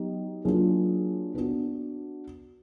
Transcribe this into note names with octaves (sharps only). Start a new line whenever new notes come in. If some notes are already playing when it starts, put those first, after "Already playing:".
Already playing: F#3 B3 D#4 G4
F#3 A#3 D4 F4 G#4
B3 D4 F#4